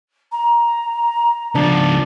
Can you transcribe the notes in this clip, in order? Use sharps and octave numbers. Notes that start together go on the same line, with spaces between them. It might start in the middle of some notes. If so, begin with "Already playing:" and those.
A#5
C#2 F3 D4